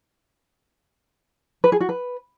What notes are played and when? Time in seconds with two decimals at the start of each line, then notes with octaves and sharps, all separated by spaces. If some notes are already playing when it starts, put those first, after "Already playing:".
1.64 B4
1.72 G#4
1.81 F#4
1.89 B4